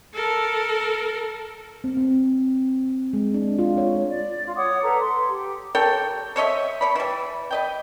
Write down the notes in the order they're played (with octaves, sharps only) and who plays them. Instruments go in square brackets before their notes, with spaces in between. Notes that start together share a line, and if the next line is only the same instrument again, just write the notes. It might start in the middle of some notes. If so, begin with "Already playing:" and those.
[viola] A4 A#4
[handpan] C4
C4
G#3
D4
F4
C#5
[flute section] D5
F4
C#5 F#5 D6 D#6
A4 B4 A#5
C6
G4
[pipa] A4 A#4 C#5 G5
C5 C#5 D#5 E5
C#5 D5 B5
E3 G3
B4 D#5 G5